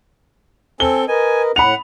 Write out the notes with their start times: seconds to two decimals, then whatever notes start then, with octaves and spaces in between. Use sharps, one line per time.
0.80 C4 A4 G#5 G7
1.08 A#4 B4 D#5 G#5
1.56 A2 F#5 B5 F7